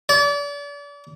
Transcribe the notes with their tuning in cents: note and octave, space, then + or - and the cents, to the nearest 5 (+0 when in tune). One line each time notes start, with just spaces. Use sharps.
D5 -35